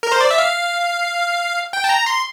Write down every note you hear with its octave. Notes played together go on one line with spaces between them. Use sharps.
A#4
C5
D5
E5
F5
G5
A5
A#5
C6